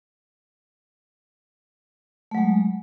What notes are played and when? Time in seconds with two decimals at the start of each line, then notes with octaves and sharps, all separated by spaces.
2.31 A3
2.35 F#3
2.38 G#3